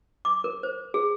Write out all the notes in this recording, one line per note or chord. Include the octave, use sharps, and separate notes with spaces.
D6
A#4
C5
G#4